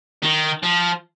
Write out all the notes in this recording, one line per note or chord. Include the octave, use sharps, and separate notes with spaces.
D#3
F3